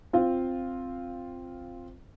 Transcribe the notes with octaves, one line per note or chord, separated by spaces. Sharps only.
C4 F4